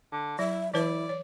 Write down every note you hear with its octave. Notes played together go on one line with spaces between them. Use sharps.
D3
F#3 E4 E5
E3 E4 B4 D5
C#5